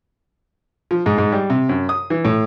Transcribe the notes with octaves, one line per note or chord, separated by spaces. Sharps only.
F3
G#2
G#2
G3
C3
F#2
D#6
E3
A2